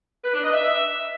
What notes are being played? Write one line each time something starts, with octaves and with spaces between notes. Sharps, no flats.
B4
D4
D#5
E5